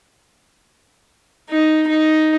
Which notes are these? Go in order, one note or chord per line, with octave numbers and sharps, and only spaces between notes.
D#4
D#4